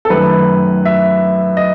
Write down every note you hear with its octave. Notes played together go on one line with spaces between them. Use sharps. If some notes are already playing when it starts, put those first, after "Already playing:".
A4
F#2 D#3 A3 B4
E5
D#5